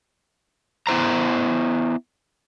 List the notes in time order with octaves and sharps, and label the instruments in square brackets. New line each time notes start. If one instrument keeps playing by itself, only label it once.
[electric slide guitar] B3 E4 C5 A#5